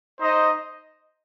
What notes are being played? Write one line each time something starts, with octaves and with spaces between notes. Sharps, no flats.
D#4 C5 D#5